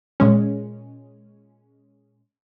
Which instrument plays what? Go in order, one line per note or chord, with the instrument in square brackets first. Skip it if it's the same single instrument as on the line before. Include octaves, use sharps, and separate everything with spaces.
[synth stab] A#2 G#3 C#4